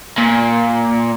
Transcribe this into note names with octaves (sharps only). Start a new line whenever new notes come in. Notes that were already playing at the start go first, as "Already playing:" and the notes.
A#2